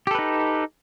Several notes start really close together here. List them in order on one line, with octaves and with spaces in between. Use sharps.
G4 A4 B4 D#4